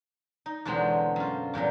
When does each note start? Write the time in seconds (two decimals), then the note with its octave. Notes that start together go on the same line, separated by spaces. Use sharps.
0.46 D#4
0.65 E2 B2 D3 F#3 G#3 C4
1.16 F#2 F4
1.54 E2 G2 A#2 F#3